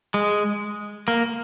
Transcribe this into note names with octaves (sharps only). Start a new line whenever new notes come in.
G#3
A#3